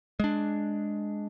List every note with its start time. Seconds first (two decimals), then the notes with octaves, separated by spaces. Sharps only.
0.20 G#3 D4